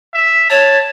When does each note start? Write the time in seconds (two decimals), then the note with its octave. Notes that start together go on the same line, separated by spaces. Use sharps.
0.14 E5
0.50 C#5 A5